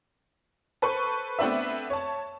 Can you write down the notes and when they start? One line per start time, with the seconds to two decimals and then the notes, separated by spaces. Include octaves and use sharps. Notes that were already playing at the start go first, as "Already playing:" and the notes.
0.82 A4 B4 C5 C#6
1.39 A3 B3 C4 D4 B4 E5
1.90 C#5 A5